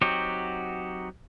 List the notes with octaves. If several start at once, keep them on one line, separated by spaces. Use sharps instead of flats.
F#3 C4 D#4 F#4 G4